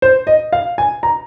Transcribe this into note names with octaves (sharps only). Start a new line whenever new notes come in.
C5
D#5
F5
G#5
A#5